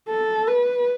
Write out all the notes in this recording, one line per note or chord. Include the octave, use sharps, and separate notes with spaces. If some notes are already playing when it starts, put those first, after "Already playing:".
A4
B4